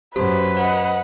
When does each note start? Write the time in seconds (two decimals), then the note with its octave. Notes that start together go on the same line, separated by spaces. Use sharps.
0.16 F#2 G4 B4 C5
0.57 C5 D#5 F#5